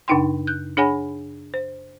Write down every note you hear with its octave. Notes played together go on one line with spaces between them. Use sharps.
F#2 C#3 D4 D#4 G5 C6
F#6 G6
D4 G#4 C#5 F#5 G#5 B5
C5